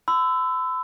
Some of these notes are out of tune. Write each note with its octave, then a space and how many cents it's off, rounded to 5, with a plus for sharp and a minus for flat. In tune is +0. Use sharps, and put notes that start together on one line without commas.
B5 +45 E6 +0